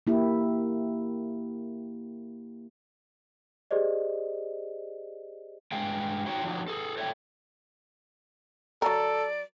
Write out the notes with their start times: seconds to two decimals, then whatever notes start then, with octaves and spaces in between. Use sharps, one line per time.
0.07 A#3 E4 G4
3.71 G4 G#4 C5 D5 D#5
5.72 G2 G#3 G#4 F5 G5
6.26 C4 D#4 F#4 C5 C#5 G5
6.44 F3 F#3 D#4 G4
6.68 G#4 A4
6.97 A4 C#5 D5 E5 F#5 G5
8.82 F#3 A4 A#4 D5